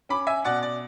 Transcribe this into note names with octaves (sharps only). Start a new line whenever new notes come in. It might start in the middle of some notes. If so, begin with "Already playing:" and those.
C#4 B5 D6
E5 G#5
B2 D5 F#5
D5